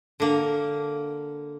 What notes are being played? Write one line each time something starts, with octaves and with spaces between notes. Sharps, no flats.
D3 A#3